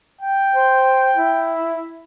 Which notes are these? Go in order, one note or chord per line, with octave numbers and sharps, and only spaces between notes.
G5
C5
E4